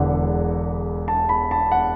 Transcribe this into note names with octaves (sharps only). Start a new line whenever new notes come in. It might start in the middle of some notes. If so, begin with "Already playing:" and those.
Already playing: E1 E2 D3 F#5
A5
B5
A5
F#5